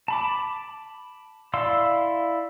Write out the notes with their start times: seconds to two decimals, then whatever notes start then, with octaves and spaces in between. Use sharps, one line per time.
0.08 A5 B5 D6
1.54 E4 D5 F5 C6 E6